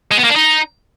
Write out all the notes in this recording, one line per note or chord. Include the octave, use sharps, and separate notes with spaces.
G#3
B3
A#3
D4
D#4